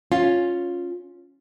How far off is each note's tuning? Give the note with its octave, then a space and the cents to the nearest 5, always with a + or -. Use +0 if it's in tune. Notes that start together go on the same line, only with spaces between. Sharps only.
C#4 +0 F4 +10